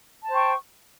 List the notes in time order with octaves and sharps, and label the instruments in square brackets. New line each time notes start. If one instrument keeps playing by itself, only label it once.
[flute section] A5
C5
G5
C#6